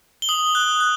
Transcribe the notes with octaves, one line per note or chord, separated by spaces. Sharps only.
G7
D#6 F#7
F#6
F#6